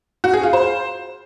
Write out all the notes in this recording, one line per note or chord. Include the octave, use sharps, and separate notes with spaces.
F#4
G#4
F4
C5